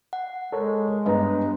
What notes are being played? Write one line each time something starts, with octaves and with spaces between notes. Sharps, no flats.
F#5
G#3 A4 A#4 C#5
G2 B3 D#5 A#5